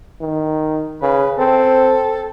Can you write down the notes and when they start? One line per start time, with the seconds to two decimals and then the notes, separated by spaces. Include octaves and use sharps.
0.21 D#3
1.02 C#3 B4
1.38 C4 A4